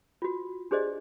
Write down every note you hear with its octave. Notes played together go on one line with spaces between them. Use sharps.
F4 F#4
D4 G4 G#4 C5 D5 D#5